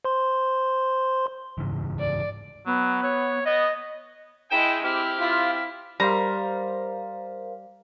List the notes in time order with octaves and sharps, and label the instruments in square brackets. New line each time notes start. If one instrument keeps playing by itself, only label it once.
[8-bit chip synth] C5 C6
[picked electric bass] G#2 C#3 E3
[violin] D5
[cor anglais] F#3 [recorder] B3
[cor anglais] C#5
[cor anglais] B3 [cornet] D#5
[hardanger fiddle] G#3 E4 [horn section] G#4 D#5 G5 [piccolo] E7
[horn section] C4 G4 [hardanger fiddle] E4 [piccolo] F6
[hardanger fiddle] E4 [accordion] F4
[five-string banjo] G3 [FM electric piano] A#4 C5 F5 [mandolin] A#5